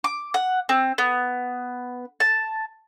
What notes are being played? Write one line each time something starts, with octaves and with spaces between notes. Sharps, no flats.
D6
F#5
C4
B3
A5